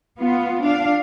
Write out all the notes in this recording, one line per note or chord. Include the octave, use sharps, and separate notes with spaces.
B3 F4
D4 F5